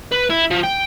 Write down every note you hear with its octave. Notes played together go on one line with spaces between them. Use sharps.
B4
E4
F3
G5